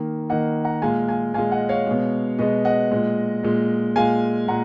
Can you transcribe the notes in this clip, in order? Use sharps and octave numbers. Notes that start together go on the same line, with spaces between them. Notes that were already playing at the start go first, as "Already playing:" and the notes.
Already playing: D#3 A#3
D#3 A#3 D#5 F#5
F#5 A#5
A#2 G#3 F5 G#5
F5 G#5
A#2 G#3 F5 G#5
D#5 F#5
C#5 F5
B2 G#3
B2 G#3 B4 D#5
D#5 F#5
A#2 G#3
A#2 G#3
A#2 G#3 F5 G#5
A#2 F#5 A#5